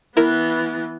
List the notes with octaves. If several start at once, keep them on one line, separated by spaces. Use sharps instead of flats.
E3 B3 E4 A#4